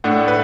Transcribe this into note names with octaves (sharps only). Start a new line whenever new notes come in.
A2 A3 D4 F#5
B4